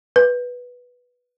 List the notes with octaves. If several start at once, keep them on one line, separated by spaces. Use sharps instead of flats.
B4